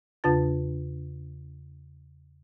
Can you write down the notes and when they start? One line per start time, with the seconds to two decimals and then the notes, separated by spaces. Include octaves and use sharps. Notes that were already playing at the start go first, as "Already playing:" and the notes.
0.24 E2 C#3 D4 F4 A5 A6